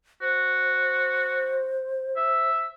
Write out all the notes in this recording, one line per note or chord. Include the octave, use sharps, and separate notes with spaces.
F#4 C5
E5